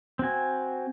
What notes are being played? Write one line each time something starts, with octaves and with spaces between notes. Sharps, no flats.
C4 F#4 G#5